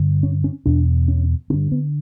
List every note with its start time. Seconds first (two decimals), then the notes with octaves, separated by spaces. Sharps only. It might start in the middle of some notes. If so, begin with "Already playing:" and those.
Already playing: G2 D3
0.23 C#4
0.44 C#4
0.66 E2 B2 D4
1.08 C#4
1.50 G2 D3 C#4
1.72 B3